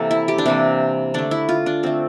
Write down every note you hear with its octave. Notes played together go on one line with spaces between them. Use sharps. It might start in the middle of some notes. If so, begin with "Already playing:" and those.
Already playing: C3 E3 A#3 A4
E4
G4
D4
C3 E3 A#3 C4
D3 A3 D4
E4
F4
D4
D3 A3 C4